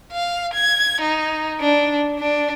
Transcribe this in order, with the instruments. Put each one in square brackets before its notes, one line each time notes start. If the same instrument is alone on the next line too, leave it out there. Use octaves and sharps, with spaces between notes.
[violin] F5
G#6
D#4
D4
D4